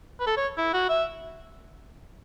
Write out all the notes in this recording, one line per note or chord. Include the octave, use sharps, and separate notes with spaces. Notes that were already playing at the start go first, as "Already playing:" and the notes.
B4
A4
C#5
E4
F#4
E5